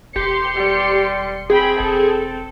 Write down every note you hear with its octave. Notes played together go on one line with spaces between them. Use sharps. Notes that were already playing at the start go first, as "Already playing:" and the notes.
E1 G4 C6 C#7
G3
C4 G#4 G5 B5
E1 A4